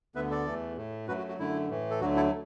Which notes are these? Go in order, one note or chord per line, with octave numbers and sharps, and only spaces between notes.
D2 D3 B3 B4 E5
A4 D5
E2 E3 A3
A2 A3
F#2 F#3 A3 F#4 B4
F#4
F#4
F#2 D3 A3 E4
A2 E3 A3
A4
D2 D3 F#3 A3 F#4
E4 A4